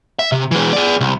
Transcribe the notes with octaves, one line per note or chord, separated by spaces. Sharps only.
E5
C3
E3 G#3
G#4 D5
C2